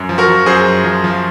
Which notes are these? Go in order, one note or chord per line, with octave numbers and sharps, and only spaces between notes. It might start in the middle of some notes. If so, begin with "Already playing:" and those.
Already playing: F#2
F3
F#4 A#4
F3
F#2 G#4 C5
F#2
F3
F3